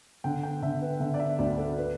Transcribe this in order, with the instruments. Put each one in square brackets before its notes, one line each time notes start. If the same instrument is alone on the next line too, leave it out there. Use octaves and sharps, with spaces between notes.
[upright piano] D3 G5
G5
D3 E5
B4
D3 E5
D5
E5
D2 D5
A4
B4